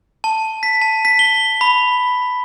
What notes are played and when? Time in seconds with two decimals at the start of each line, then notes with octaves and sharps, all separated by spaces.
0.24 A5
0.63 B6
0.81 A5
1.05 B6
1.19 G7
1.61 B5